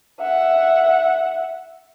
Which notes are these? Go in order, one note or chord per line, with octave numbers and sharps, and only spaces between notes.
E5 F#5